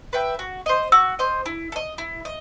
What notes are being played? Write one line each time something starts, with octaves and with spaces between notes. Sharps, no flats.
B4 E5 G5
F#4
C5 D#5
F#4 E6
C5 D#5
E4
A4
D#5
E4
D#5